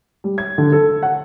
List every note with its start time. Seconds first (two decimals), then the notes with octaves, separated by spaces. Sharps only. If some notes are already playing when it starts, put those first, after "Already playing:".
0.24 G3
0.38 G#6
0.58 D3
0.72 A4
1.03 F#5